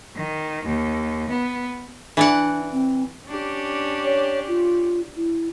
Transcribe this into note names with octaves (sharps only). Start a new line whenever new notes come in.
D#3
D#2
B3
E3 D4 D5 F#5
C4
C#4 D4 G4
C#5
F4
E4